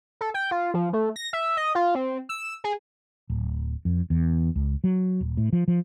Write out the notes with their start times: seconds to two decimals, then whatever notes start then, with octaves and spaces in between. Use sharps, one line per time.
0.21 A4
0.34 G5
0.51 F4
0.74 F3
0.93 A3
1.16 A#6
1.33 E5
1.57 D#5
1.75 F4
1.95 C4
2.29 E6
2.64 G#4
3.30 D1
3.85 F2
4.10 E2
4.56 C#2
4.84 F#3
5.21 D#1
5.37 A2
5.53 F3
5.68 F3